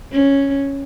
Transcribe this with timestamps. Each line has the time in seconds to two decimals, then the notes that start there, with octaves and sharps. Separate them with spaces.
0.13 C#4